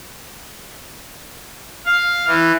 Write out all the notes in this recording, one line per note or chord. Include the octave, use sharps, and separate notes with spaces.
F5
E3